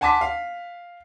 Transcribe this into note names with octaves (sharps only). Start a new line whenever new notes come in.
F#5 G#5 A5 C6 D6 B6
F5